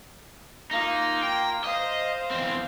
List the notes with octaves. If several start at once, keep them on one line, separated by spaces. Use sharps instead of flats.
A#3 D#4 F4
G5
C5 D#5 F5
E2 C4